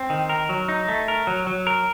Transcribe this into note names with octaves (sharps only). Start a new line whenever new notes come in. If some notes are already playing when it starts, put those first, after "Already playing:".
Already playing: C4
D#3
A#4
F#3
D#4
A3
A#4
F#3
F#3
A#4